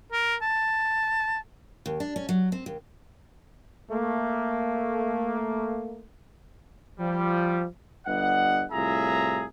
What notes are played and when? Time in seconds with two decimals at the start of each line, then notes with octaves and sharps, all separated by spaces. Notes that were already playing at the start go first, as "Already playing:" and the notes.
0.12 A#4
0.42 A5
1.86 D#2
2.00 D4
2.16 C#4
2.29 F#3
2.52 C4
2.66 D#2
3.91 A3 A#3
6.99 F3 G3
8.07 G1 G2 D#5 F#5
8.72 C2 A2 F4 G#4 E5 A#5